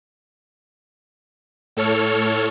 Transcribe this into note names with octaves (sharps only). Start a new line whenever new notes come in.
A2 A4 C#5 F6 C#7